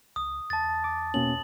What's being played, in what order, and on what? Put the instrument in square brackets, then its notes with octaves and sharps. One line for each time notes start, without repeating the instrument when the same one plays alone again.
[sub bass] C#2 [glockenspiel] D#6
[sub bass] E2 [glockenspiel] A5 A6
[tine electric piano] D6
[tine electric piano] B2 A#3 C#4 [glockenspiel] F#7